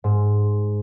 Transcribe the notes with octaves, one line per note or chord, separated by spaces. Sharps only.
G#2